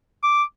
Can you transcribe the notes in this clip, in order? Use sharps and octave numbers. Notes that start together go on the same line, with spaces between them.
D6